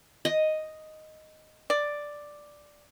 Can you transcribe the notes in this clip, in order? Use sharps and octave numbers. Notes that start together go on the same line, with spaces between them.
D#5
D5